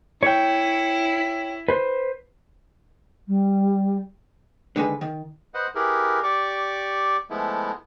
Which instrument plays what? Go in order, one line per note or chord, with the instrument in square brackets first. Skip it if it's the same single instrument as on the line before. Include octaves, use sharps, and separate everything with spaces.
[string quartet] E4 [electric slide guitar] C#5 G5
[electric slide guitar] B4 C5
[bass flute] G3
[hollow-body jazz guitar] D3 D#3 G#3 B4
D#3
[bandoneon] B4 C5 D#5 F#5
E4 G4 G#4 A#4 B4
G4 D5 C#6 D6
F3 G#3 A3 B3 E4